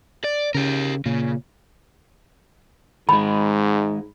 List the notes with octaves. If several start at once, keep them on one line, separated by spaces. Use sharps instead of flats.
D5
C#3 G4 A#4
A#2 C#3
G#2 D#3 G#3 B5